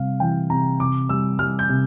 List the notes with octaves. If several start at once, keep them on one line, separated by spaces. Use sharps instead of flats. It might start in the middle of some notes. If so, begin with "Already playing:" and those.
Already playing: C3 G3 F5
E3 G5
C3 A#5
C3 D6
G3 E6
G3 F6
G6
C3